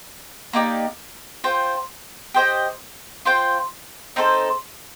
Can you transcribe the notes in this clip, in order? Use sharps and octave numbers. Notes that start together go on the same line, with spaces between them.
A#3 D#4 G4 D5
F4 C5 G5
G4 C5 D#5 G5
F4 C5 G5
C4 D#4 A4 C5